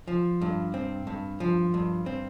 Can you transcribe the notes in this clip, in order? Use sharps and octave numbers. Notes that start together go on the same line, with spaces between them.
F3
G2
C4
G2
F3
G2
C4